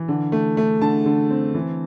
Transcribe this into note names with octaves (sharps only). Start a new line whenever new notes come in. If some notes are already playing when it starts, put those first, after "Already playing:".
Already playing: E3
D3
A3
A3
D3 A5
D3
C4
E3